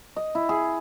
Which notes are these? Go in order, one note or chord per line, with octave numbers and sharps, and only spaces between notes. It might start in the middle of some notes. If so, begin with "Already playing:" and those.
D#5
E4
G#4